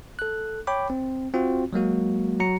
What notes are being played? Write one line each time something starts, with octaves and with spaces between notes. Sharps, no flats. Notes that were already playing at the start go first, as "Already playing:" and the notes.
A4 F#6
C#5 G5 B5 D6
C4
C4 F4 F#4
F#3 G#3 A#3 F#4
F#3 F#4 A#5 C#7